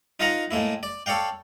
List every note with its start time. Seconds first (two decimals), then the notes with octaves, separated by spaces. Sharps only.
0.20 D#4 F4 A#4 D#5 F#5 A#5
0.51 A2 G#3 A#3 E4
0.83 D5
1.06 A4 C#5 D5 F5 G5